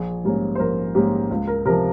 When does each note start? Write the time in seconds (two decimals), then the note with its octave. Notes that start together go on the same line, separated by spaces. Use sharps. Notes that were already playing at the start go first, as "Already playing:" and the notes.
Already playing: A#1 G#4
0.24 G#2 G3 A#3 C#4
0.55 C5
0.60 A#1 A#4
0.95 G#2 G3 A#3 C#4 G4
1.31 C#2
1.47 A#4
1.65 C3 F3 A#4